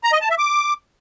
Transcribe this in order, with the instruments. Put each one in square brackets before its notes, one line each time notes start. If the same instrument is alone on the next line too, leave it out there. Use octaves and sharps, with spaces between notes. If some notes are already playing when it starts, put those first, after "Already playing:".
[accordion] A#5
D#5
A5
E5
D6